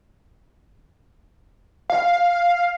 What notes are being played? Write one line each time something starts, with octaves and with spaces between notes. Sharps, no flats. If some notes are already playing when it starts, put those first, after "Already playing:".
F5